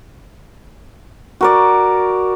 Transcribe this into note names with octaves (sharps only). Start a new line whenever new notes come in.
F#4 A#4 D5